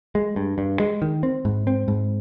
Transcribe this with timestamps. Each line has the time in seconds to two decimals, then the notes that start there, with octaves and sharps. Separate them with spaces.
0.15 G#3
0.36 G2
0.58 G2
0.80 G#3
1.02 D#3
1.23 C4
1.45 G#2
1.67 C4
1.88 G#2